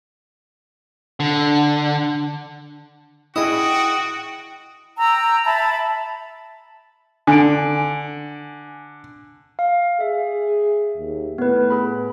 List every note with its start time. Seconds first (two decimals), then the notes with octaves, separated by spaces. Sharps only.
1.20 D3
3.36 E4 F#4 G#4 D#5 G5
4.97 G5 A#5 E6
5.45 E5 A5 B5
7.27 D3 G#5 D7
9.59 F5
10.00 G#4 E5
10.97 D#2
11.38 A2 B3 B4
11.70 G#4 B5